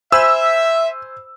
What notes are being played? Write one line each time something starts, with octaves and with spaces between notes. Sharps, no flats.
C5 E5 G#5 B5 E6